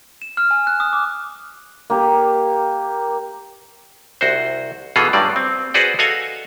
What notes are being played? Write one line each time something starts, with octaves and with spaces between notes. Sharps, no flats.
E7
F6
G#5
F#6
D#6
D6
A#3 G4
C2 F#4 C5
B2 E3 B3 F4 G#4 A4
G2 F#3 G3 D5
C4
F#4 G#4 B4 C5 D5 F#5
F#4 A4 D#5 F5 F#5 G#5